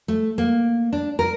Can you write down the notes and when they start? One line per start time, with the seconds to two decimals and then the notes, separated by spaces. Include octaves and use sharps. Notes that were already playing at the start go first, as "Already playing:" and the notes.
0.08 A3
0.38 A#3
0.93 D4
1.19 A#4